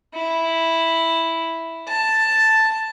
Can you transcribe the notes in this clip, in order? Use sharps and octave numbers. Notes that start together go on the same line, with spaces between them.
E4
A5